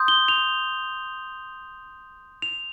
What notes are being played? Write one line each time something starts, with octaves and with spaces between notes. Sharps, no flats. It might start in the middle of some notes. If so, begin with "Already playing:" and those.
Already playing: C6 D#6 G6
G7
F7
F7